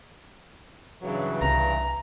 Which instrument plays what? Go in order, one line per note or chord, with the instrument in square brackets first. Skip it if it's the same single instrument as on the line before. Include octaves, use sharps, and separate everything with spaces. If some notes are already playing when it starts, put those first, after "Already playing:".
[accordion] G2 C#3 E3 [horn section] F#3
[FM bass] C2 [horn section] A#5